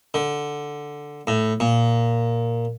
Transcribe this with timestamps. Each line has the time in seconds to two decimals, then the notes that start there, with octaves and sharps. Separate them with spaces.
0.14 D3
1.27 A2
1.60 A#2